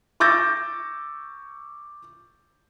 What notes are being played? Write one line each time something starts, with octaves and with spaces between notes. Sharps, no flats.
C#6 D6 E6 G6 A6 A#6